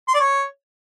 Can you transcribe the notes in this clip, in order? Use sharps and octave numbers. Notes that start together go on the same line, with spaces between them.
C6
D5
C#5